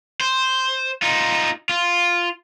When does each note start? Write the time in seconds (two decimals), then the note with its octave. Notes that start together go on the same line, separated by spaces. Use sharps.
0.21 C5
1.02 D#4 F4
1.69 F4